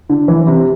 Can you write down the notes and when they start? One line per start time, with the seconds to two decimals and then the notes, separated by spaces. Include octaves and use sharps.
0.09 D3
0.28 E3
0.47 C3